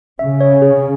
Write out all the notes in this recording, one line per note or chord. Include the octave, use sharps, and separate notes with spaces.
C#3 E5
C#5
G#4